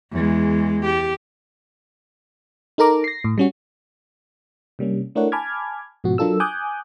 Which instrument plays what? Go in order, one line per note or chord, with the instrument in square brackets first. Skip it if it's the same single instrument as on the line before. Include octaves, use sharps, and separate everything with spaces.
[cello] E2 G#3
G4
[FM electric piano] D#4 A4 A#4 A#5 D6
A#6 C7
A2
G3 C#4 F#4
C3 G3 A#3 C#4
A3 D4 E4 A#4 C#5 F#5
G#5 A5 B5 D6 F6 G#6
G#2 B2 F3 F#4
F#3 D4 F4 A4 A#4 E6
G#5 D6 D#6 F#6 G6